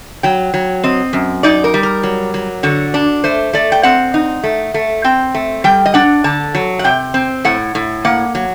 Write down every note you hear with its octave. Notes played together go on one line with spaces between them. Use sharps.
F#3 G5
F#3
C4 D#5
F#2
D#4 D5
A#4
G3
A#4
F#3
F#3
D3 F#4
D4
A3 C5
A3 D5
G5
C4 F#5
D#4
A3
A3
C4 G5
A3
G3 G5
D#5
D4 F#5
D3 A5
F#3
F#5
C3 G5
C4
A2 F#5
A2
A#3 F#5
F#3